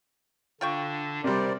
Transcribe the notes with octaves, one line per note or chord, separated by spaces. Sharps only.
D3 D4 F4 G5 C#6
C3 G3 A#4 C5 D5